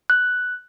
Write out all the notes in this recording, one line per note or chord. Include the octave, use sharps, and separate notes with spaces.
F#6